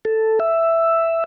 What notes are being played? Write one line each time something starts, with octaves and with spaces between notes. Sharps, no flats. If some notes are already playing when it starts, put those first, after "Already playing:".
A4
E5